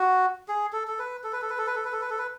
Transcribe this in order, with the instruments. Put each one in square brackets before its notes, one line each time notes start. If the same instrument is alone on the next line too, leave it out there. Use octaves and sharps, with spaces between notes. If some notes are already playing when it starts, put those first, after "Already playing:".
Already playing: [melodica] F#4
G#4
A4
A4
B4
A4
B4
A4
B4
A4
B4
A4
B4
A4
B4
A4
B4